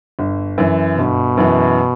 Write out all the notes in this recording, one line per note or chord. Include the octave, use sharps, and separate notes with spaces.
G1
F#2 E3
G1 B2
F#2 E3